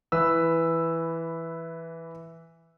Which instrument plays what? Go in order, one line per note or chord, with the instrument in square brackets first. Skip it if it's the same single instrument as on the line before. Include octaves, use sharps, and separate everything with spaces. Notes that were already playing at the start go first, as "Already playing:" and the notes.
[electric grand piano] E3 B4 E6